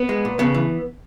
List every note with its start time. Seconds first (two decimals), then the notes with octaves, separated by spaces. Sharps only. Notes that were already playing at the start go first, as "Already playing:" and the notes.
Already playing: B3
0.09 G#3
0.25 A#2
0.39 C#3 B3
0.55 E3